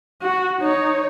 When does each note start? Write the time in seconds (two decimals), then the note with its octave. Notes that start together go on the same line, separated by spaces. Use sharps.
0.22 F#4
0.62 D#4 C#5